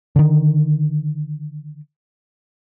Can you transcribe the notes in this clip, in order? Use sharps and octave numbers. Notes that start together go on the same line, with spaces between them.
D3 D#3